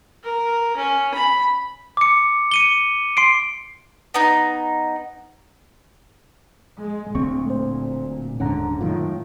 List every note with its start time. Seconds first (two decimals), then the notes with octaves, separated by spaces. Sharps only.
0.24 A#4
0.77 C#4
1.14 B5
1.97 D6 C#7
2.52 C#7 D#7 G7
3.17 C6 C7 D7
4.14 B3 D#4
6.79 G#3
7.15 D1 D2 A#2 C4 C#6
7.47 A3 C5
8.40 D#1 G#2 D3 C#4 F#5 A#5
8.81 F#2 A2 D#3 F4